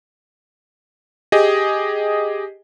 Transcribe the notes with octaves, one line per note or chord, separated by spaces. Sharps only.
G4 G#4 D#5